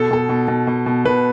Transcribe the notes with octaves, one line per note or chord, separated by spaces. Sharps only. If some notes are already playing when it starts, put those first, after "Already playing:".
Already playing: B2 A4
B2 A4
B2
B2
B2
B2
B2 B4